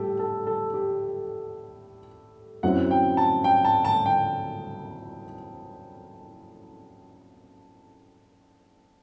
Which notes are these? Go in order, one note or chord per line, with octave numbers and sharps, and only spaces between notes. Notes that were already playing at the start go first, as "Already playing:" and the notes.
Already playing: A2 G3 G4 A4
A4
A4
G4
F#2 F#3 C4 E4 F#5
G5
A5
G5
A5
A5
G5